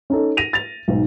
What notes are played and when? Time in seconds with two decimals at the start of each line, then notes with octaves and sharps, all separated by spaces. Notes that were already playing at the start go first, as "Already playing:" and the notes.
0.10 C#4 D#4 A4
0.37 A#6 D#7 F7
0.53 A6 F7
0.88 B1 G#2